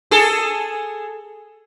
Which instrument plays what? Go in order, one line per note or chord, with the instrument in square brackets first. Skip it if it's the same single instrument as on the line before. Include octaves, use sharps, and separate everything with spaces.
[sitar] G#4 A4